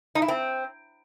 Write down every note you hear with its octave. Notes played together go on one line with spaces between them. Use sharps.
D#4
E4
C4